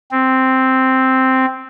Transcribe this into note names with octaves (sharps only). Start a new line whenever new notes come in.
C4